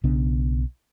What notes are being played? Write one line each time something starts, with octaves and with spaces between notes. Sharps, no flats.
B1 C#3 B3 D4